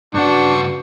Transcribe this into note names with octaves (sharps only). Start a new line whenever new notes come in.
G2 C#3 D4 F#4 B4 C5 F#5 C#6